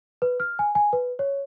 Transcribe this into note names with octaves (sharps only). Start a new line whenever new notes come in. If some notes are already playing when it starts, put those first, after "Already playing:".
B4
F6
G#5
G#5
B4
C#5